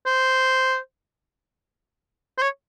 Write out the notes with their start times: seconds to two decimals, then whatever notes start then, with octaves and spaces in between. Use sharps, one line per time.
0.06 C5
2.38 C5
2.42 C#5